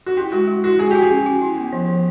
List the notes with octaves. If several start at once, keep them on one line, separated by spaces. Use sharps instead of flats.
F#4
E4 G4
G#3 F#4
G#3
E4 F#4
G#3 G#4
F#4 G4
G#4
C#4
F#4
E4
B3
F3
F3